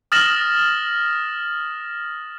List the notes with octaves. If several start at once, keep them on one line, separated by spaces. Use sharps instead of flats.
D#6 F6 A6 A#6 E7 F#7